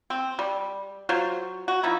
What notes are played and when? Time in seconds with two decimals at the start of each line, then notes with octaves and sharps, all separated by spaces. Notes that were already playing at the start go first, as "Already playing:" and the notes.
0.10 C4
0.39 G3
1.09 F#3 F4 C5 C#5
1.68 F#4
1.83 F3 D#4 E4